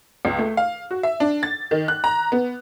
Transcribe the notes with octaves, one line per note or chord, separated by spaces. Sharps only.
C#2
A3
F5
F#4
E5
D4
A6
D#3
F#6
A#5
B3